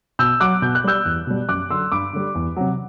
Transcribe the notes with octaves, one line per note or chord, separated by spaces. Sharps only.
B2 E6 G6
F#3 D6 F#6
B2 G6
F#6
G3 E6 G6
E2
B2 G3
F#2 D6 F#6
D3 F#3 C6 E6
G2 B5 D6
D3 G3
E2
C3 F#3